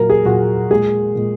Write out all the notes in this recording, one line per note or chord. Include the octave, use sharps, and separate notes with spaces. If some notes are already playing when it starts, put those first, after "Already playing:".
Already playing: A#2 F#3 A#3 A#4
G#4
A#2 F#3 A#3 F#4
A#2 G#3 G#4
A#2 G#3